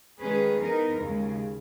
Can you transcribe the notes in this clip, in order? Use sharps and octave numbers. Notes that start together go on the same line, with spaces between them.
D#3 G#3 C#4 G#4 B4
E3 B3 D#4 A#4
D#2 C#3 G#3